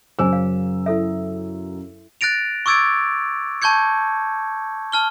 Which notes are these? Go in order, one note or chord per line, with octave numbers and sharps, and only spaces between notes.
F#2 C#3 G#4 C5 G#5 E6
F5
E4 A4 E5
F#6 A6 A#6 D7 F7
C#6 D6 E6 G#6 A6 D7
A5 C#6 G6 G#6 C#7
A5 F6 G7